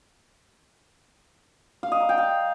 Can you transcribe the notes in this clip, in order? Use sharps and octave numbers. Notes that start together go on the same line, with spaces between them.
F5
D#5
A#5
G5
F5